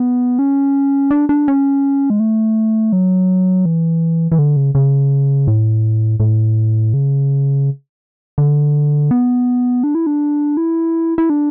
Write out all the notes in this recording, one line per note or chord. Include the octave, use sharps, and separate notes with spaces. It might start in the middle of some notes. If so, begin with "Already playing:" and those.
Already playing: B3
C#4
D4
D4
C#4
G#3
A3
F#3
E3
E3
D3
C#3
C#3
A2
A2
C#3
D3
B3
D4
E4
D4
E4
E4
D4